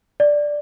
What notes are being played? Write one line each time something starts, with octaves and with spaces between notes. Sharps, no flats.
D5